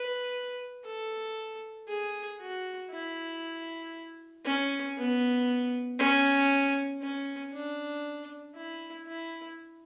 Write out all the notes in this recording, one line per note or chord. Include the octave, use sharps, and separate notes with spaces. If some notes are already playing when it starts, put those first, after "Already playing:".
Already playing: B4
A4
G#4
F#4
E4
C#4
B3
C#4
C#4
D4
E4
E4